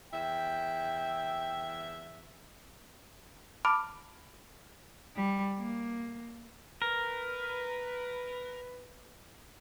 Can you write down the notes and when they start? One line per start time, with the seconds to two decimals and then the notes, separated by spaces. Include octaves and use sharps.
0.13 E2 E5 G5
3.65 A5 B5 D6 F6 D7
5.16 G3
5.58 A#3
6.82 A#4 B4